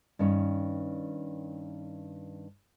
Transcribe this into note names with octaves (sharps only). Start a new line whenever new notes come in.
G2 D#3 C#4